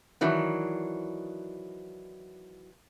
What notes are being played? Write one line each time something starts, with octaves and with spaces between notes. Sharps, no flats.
D#3 E3 F#3 D4